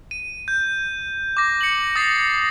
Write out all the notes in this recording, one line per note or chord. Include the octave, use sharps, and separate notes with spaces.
D#7
G6
D6 A#6
C#7 F#7
D#6 A6 A#6 C7